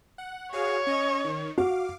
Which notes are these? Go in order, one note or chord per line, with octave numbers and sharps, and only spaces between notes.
F#5
F#4 G#4 C#5 F5
C#4 D#5
D#3
F#4 F5 D6